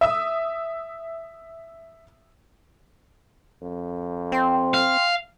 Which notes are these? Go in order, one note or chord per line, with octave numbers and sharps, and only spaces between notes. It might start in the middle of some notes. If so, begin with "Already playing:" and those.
E5 D#6 E6
F2
C4 G5 C6
F5